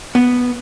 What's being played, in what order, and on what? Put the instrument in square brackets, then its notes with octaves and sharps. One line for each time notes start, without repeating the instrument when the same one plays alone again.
[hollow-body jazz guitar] B3